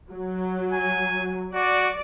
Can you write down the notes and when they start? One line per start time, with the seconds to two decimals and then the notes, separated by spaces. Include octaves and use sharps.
0.12 F#3
0.73 G#5
1.54 F#4 D5